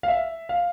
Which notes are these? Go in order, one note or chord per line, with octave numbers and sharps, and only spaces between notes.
F5
E5
F5